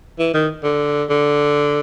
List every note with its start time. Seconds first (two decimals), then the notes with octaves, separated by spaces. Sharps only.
0.19 E3
0.34 D#3
0.63 D3
1.09 D3